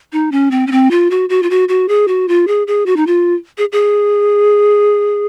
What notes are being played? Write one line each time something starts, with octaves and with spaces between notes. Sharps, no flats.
D#4
C#4
C4
C#4
C4
F4
F#4
F#4
F4
F#4
F#4
G#4
F#4
F4
G#4
G#4
F#4
D#4
F4
G#4
G#4